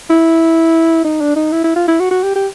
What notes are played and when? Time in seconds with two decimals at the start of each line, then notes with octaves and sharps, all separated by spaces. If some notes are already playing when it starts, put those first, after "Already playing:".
0.10 E4
1.04 D#4
1.21 D4
1.36 D#4
1.52 E4
1.64 E4
1.76 F4
1.88 E4
2.00 F#4
2.11 F#4
2.23 G4
2.35 G4